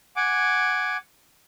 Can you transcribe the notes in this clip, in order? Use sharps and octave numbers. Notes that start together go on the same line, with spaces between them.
F#5 G#5 D6